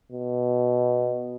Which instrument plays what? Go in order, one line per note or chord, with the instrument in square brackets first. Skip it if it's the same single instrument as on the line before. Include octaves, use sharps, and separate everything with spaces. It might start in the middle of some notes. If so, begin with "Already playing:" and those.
[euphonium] B2